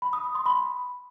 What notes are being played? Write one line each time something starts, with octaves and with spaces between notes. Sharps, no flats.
B5
D#6
D#6
C6
B5